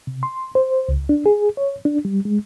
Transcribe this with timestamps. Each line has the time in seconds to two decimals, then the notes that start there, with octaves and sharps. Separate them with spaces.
0.07 C3
0.23 C6
0.55 C5
0.89 C#2
1.09 D4
1.26 G#4
1.57 C#5
1.85 D4
2.05 G3
2.25 G#3